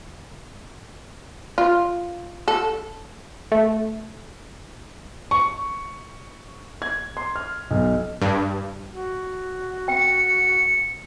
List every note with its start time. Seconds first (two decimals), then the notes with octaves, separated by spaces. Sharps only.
1.58 F4
2.48 A4
3.52 A3
5.31 C#6
6.82 G#6
7.17 C6
7.36 F6
7.71 B1
8.22 G2
8.92 F#4
9.88 G5 C#7